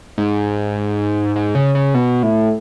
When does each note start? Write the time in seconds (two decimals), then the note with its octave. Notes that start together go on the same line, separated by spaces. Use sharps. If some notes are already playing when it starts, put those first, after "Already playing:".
0.18 G#2
1.36 G#2
1.55 C#3
1.75 C#3
1.94 B2
2.23 A2